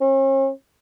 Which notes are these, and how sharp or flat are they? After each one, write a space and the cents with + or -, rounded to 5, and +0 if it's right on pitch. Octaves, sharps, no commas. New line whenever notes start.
C#4 -45